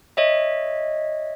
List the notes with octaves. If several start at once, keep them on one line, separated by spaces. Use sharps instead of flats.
C#5 D#5 E5